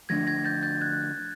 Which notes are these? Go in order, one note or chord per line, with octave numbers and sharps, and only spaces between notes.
D3 F3 A3 D4 G#6 A#6
G#6 A#6
G6 A6
G6 A6
F#6 G#6